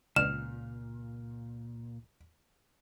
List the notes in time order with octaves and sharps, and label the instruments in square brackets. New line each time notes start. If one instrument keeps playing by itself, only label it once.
[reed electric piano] C#2 [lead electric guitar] A#2 [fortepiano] F6 [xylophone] E7